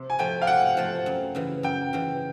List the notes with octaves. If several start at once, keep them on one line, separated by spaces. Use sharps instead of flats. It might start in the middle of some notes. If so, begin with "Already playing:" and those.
Already playing: C3
G#5
F3 A3 G5
F5
C3 F#5
F3 A3
F#2
C#3 E3
F#2 G5
C#3 E3